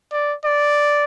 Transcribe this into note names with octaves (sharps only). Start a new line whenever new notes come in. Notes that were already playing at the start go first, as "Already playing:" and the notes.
D5
D5